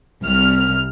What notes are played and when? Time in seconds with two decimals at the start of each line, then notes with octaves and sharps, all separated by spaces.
0.23 C2 F6